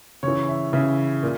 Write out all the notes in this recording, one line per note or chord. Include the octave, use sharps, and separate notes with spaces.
C#3 E3 C#5
E5
C#3 E3 E5
A#2